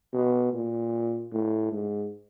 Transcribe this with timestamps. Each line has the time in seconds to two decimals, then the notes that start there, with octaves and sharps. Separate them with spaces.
0.13 B2
0.53 A#2
1.32 A2
1.72 G#2